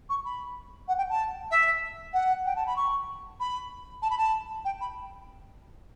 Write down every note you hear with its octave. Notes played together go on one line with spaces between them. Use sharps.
C#6
B5
F#5
G5
A5
E5
F#5
G5
A5
B5
C#6
B5
A5
B5
A5
G5
B5